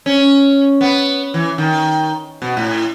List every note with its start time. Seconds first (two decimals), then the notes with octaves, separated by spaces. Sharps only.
0.06 C#4
0.81 B3
1.34 E3
1.58 D#3
2.42 B2
2.57 A2